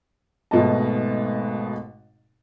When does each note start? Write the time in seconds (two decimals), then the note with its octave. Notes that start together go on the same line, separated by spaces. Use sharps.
0.51 G#1 G#2 B2 A3 D#5 A5